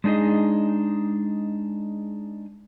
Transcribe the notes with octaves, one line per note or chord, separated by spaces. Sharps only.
G#3 D4 D#4 G#4 D#5